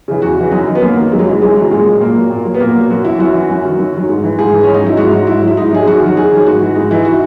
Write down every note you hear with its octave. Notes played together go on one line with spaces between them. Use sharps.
C#3 E3
E2 F#4
C#3 E3
F#2 D#4
D#3 F#3
B3
F#2 A#3
D#3 F#3
F#2 G#3
F#3
C#3 E3 G#3
F#2 G#3
C#3 E3 F#3
A#2 G#3
F#3
A#2 A#3
F#3
A#2
F#3
B3
A#2 A#3
F#3
F#2 F#4
E3 E4
F#2 F#4
E3
F#2
D#3 F#3
F#2
D#3 F#3
G#2
E3
G#2 G#4
E3
G#2 C#4
D#4
F#3 E4
G#2 F#4
F#3
G#2 E4
F#3
E4
G#2 D#4
F#3 G#4
F#2 F#4
D#3 F#3
F#2 G#4
D#3 F#3
G#2 F#4
E3
G#2 D#4
E3 E4
F#4